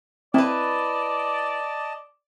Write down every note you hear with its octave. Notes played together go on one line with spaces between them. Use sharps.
C4 E4 B4 D5 D#5 A5